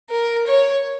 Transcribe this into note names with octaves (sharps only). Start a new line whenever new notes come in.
A#4
C#5